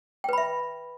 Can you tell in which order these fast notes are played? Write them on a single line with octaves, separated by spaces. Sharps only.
G5 B4 B5 E5